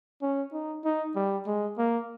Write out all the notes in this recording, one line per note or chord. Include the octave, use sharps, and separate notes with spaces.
C#4
D#4
D#4
G3
G#3
A#3